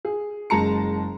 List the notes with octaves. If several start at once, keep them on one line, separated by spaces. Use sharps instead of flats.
G#4
F#1 G#3 A5 A#5 C#7